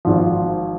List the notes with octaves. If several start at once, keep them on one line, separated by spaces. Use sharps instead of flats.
G#1 G#2 F3